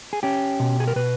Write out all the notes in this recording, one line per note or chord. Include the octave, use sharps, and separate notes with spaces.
G#4
C#4 G4
B2
G#4
A#4
B2 B4